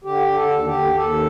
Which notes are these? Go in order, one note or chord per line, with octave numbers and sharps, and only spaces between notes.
D3 G4
D3
A4
D#2
G4
D#2
D#2 A4